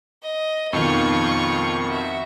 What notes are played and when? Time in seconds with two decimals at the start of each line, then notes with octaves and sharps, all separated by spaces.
0.23 D#5
0.73 F2 B2 D#3 F4 C#6
1.88 F#4 E5